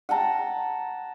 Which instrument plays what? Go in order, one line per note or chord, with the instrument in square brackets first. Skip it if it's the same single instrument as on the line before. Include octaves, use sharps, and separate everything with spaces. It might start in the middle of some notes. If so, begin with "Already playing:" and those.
[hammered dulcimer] F#5 G5 A5 A#5